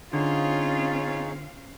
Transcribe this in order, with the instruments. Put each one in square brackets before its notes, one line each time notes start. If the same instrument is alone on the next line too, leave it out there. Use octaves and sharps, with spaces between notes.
[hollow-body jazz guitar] D3 [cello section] C4 C#4 F5 [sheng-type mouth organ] D#4 G#4 C#5 [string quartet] F4